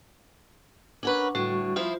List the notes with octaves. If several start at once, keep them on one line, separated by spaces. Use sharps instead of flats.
C#4 D4 A#4 B4 F#5 C#6
A2 D3 G3 F#4 C#6
F3 E4 F4 C5